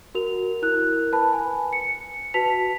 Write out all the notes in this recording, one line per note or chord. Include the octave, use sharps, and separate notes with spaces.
F#4 A#4 F7
E4 A#4 F#6
B4 A5 B5
G#5
C#7
F#4 B4 A5 B6 F7